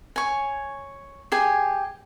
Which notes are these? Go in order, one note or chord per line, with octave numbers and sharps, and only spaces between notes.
C#5 G#5
G4 G#4 G#5